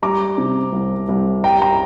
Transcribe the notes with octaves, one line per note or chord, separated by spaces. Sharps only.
G3 A#5 D6
C3
C2
C2
G3 G5 A#5
G5 A#5